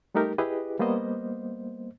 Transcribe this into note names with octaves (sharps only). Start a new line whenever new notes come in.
G3 A3 D#4 G4 A#4
E4 G4 G#4 B4 D#5
G3 A#3 B3 C5 D#5